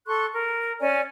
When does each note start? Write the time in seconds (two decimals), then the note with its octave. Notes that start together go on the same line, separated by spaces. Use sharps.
0.07 A4 C6 C#6 F#6
0.34 A#4
0.81 C#4 D5 G#5